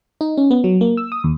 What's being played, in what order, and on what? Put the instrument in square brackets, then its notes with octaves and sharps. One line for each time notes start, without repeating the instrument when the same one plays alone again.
[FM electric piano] D#4
C#4
B3
F#3
A#3
E6
D#6
D#2